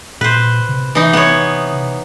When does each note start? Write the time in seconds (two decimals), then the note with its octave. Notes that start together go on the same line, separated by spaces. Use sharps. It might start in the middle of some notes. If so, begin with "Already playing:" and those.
0.21 A#2 B4 C5
0.69 C3
0.95 E3 D#4
1.13 B3 C#5